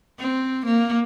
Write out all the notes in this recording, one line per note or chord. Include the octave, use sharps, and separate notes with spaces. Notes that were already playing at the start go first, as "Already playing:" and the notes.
C4
A#3